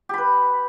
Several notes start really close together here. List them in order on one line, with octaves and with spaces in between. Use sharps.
G4 B5 B4